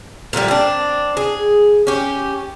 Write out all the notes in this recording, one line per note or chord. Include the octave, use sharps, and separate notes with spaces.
A#2 D3 D#3 G3
C4 D4
G#4
C#4 G4